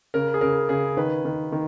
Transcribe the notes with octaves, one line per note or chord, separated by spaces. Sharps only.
C#3 A#4
G#4
C#3 A#4
C#3 G#4
D#3 B4
D#3
D#3